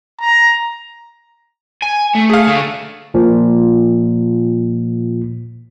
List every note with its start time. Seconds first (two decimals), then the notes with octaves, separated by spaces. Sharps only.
0.20 A#5
1.82 G#5
2.15 A3
2.30 G#4 F5
2.47 D3 A3
3.14 A#2 F3